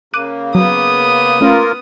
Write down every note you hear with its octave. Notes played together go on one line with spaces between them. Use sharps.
C#3 A#3 D6 F#6 D#7
F#3 B3 D#6
A3 A#3 C#4 F4 A#4